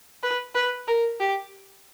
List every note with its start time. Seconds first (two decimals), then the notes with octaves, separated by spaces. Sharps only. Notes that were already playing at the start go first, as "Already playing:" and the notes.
0.23 B4
0.55 B4
0.87 A#4
1.20 G4